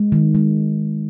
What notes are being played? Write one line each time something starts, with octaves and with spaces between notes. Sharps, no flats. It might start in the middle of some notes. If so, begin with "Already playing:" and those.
Already playing: G#3
D#3
G#3